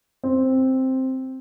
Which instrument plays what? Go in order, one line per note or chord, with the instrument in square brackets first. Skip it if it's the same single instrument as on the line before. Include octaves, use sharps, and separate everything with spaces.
[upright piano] C4